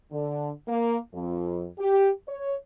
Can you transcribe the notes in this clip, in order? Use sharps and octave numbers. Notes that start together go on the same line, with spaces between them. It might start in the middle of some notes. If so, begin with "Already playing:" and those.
D3
A#3
F2
G4
C#5